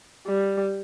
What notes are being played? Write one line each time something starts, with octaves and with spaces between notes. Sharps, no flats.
G3